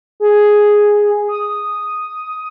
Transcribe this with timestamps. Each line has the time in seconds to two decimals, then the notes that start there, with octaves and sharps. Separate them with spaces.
0.20 G#4
1.28 D#6